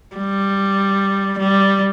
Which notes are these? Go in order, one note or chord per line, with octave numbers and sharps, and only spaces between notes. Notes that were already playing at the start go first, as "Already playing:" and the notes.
G3
G3